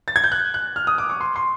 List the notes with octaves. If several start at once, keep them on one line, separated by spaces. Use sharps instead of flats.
A6
G#6
G6
F#6
F#6
F6
D#6
D6
C#6
C6
C6